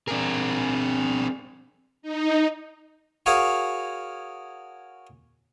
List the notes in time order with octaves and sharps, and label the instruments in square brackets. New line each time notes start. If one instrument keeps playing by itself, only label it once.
[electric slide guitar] C4 A#4 [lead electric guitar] D4 G#4
[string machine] D#4
[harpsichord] F#4 G#4 A#4 C#5 F5